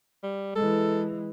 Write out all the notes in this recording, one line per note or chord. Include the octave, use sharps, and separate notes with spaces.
G3
E3 G#3 A4